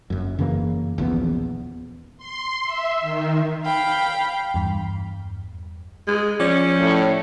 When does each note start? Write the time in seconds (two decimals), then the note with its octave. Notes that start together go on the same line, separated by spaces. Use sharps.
0.10 F#1 F#2
0.39 F#2 C#3 E3 A#3
0.98 D#1 A#1 E2 B3
2.18 C6
2.64 E5
3.01 D#3
3.63 F5 G5 B5
4.54 E2 G2
6.07 G#3
6.40 F3 C#4 D5
6.79 A2